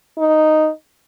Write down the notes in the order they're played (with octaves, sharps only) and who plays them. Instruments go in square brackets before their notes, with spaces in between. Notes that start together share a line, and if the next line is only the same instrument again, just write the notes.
[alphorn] D#4